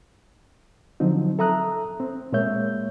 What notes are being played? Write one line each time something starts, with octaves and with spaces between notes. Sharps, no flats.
D3 F3 F#3 C4 D#4
A4 E5 A#5 D#6 F#6
C4
A#2 G#3 A#3 C#5 E5 G6